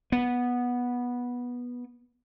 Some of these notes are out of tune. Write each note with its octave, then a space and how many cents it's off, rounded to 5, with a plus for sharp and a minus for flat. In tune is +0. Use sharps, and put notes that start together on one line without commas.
B3 -10